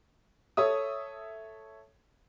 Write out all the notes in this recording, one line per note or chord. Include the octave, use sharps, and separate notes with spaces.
A4 C#5 E5 D#6